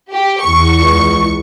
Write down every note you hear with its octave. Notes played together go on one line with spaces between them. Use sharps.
G4
E2 C#6
C#2